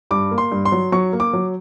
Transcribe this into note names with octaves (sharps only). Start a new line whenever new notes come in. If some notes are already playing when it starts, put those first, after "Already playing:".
G2 D6
A#3
C6
G2
C6
F#3
F#3 C#6
A#3
D6
F#3